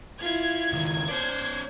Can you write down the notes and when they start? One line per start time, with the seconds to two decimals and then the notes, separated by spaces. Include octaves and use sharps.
0.21 E4 F4 G#6
0.73 C#2 D#3
1.08 C#4 C5 D5